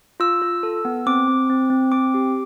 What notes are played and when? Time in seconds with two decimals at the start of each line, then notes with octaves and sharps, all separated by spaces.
0.20 F4 E6
0.42 F4
0.63 A4
0.85 B3
1.06 C4 D6
1.28 C4
1.50 C4
1.70 C4
1.92 C4 D6
2.14 G4